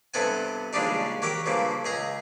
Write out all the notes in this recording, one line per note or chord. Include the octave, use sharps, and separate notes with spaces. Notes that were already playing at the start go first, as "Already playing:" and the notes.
G2 C3 B3 A4 F#5 G#5
A#1 C#3 G3 G#3 D4 D#4
F#3 G4 A#4 G5
G2 C#3 F3 A#3
C#2 G#4 A#5